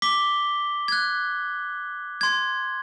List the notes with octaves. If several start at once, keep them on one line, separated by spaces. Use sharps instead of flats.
D6 B6 G7
F#6 G#6
C6 G#6